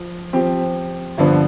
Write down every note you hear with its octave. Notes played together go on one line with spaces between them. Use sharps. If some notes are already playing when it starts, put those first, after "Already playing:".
Already playing: F3
F3 C4 G4
G2 D3 F3 B3 D4